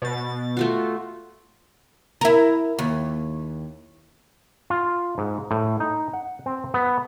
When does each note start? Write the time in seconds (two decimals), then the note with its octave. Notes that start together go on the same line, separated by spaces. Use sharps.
0.02 B2 A6
0.57 A3 F4 F#4
2.21 E4 A#4
2.79 D#2
4.70 F4
5.18 G#2
5.51 A2
5.80 D#4
6.13 F#5
6.46 C4
6.74 B3